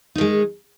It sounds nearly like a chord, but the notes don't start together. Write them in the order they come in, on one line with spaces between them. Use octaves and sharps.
D#4 D#3 G#3